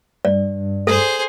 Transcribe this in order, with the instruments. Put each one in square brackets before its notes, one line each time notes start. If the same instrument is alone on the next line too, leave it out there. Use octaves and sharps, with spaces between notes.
[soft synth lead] G2 [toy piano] D5
[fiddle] G#4 C5 [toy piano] A4